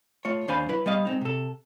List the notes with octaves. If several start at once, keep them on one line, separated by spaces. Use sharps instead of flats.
A3 F4 C#5
D#2 D4 C5 F5 G#5 B5
F#3 E4 B4
G3 B3 D#5 F5
G#3 C4 D#4
C3 A4